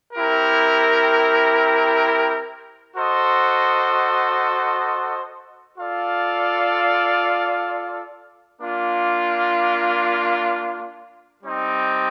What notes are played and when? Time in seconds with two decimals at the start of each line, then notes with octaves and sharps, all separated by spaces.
0.13 C4 E4 G4 A#4
2.96 F#4 A4 C5 D#5
5.78 F4 A4 D5 F5
8.60 A#3 D4 F4
11.42 G3 C4 D#4